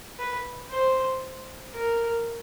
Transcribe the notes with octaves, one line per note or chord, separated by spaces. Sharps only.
B4
C5
A#4